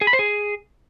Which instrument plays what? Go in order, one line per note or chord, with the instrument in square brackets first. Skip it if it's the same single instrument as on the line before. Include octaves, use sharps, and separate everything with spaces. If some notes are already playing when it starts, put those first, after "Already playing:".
[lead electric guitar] G#4
B5
C5
G#4